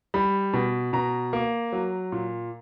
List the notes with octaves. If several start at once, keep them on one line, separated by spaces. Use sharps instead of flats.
G3 B5
B2
B2 A#5
A#3
F#3
A#2